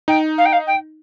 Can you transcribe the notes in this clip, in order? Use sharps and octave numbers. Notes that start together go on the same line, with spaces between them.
D#4 G5
F5
G5
F5
G5